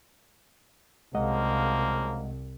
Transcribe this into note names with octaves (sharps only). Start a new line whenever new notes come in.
C2 C#3 F3 G#3 A#3 D#5 F#5